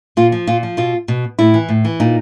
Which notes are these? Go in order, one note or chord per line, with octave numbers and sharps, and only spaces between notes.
A#2 F4
F3
A#2 F4
F3
B2 F4
B2
A2 E4
E3
A2
E3
A#2 D#4